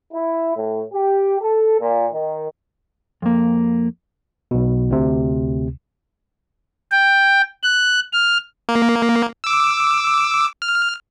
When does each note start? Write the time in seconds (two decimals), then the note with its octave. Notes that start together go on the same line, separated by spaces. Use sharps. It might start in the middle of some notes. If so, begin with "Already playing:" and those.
0.13 E4
0.56 A2
0.94 G4
1.41 A4
1.81 A#2
2.12 D#3
3.22 F2 A#3
4.51 B1 B2
4.90 D2 C3
6.92 G5
7.63 F#6
8.13 F6
8.69 A#3
9.44 D6 E6
10.62 F6